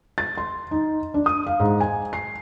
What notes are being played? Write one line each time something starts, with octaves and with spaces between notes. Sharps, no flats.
A6
C6
D#4
D4
D#6
F5
G#2
G#5
C7